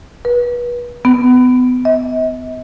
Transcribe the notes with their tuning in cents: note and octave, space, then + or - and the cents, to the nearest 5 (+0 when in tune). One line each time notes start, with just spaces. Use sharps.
B4 -30
B3 +30
D#5 +45